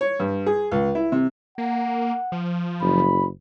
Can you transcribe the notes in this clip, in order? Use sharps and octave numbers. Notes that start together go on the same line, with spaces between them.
C#5
G2
G#4
C#2
E4
C3
A#3 F#5
F3
F#1 B5